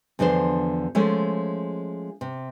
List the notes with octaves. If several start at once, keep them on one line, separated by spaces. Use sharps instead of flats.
E2 D3 F3 D4 C5
F3 G#3 A3 C#4
C3